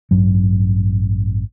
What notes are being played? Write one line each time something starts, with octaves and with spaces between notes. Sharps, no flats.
A1 G2 F#3